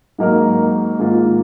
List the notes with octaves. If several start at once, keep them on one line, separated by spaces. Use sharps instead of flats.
G#2 F#3 A#3 D#4 A#4
G#2 D#3 A#3 F4